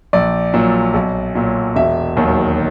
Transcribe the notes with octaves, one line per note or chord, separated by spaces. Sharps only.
A#1 D5
A#2 F#3
B1
A#2 F#3
E1 E5
D#2 D#3 F#3